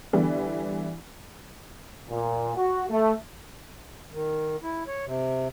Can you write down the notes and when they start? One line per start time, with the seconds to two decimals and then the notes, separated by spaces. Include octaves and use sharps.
0.13 D3 E3 G3 B3
2.09 A#2
2.56 F#4
2.90 A3
4.12 D#3
4.63 E4
4.87 C#5
5.06 C3